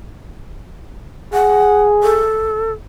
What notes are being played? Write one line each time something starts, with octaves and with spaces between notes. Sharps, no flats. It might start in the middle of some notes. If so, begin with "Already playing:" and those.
G#4 F#5
A4